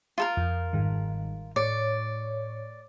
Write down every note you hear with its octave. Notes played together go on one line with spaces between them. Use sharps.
F4 A4 A#4
F2
G1 G#2 D#3
A2 C#5 D5